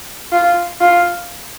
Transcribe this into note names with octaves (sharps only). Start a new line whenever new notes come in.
F4
F4